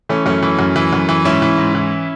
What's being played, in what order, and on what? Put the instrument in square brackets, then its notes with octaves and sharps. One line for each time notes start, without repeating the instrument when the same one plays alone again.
[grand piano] E3 A3 C#4
F#2 A3 C#4
E3
F#2
E3
F#2
E3
G#2 C#4 E4
E3
G#2
E3